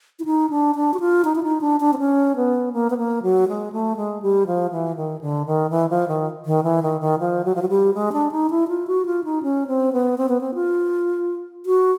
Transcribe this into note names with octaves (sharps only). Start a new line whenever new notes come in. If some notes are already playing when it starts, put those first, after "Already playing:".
E4
D#4
D4
D4
F#4
F4
D#4
E4
D#4
D4
D4
C4
C#4
B3
A#3
B3
A#3
F#3
G#3
A3
G#3
G3
F3
E3
D#3
D3
D#3
E3
F3
D#3
D#3
E3
D#3
D#3
F3
F#3
F3
F#3
G3
G#3
D4
D#4
E4
F4
F#4
F4
D#4
C#4
C4
B3
C4
B3
C4
F4
F#4